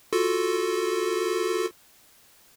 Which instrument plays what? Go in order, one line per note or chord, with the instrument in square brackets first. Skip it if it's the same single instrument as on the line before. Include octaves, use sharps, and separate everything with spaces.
[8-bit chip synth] F4 F#4 A4